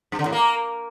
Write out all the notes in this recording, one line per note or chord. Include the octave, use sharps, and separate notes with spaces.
G2
D3
A2
A#3